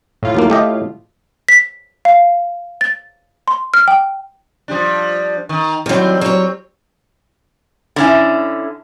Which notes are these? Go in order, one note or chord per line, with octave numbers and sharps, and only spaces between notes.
A2 F4
D#2 F#3 A#3
A3 G4 D#5
B6
F5
A6
C6
F6
G5
F3 G3 D4
D#3
D#3 F#3 G3 C4
F#3 C#5
D3 C#4 E4